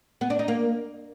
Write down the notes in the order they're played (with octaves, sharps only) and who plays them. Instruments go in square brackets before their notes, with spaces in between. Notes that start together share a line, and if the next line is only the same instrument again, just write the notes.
[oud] B3
D4
D#4
A#3